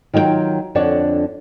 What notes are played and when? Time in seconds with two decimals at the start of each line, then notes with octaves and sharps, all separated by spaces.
0.13 D#3 F#3 F4 D#5 G5
0.75 F2 D3 D4 C#5 F#5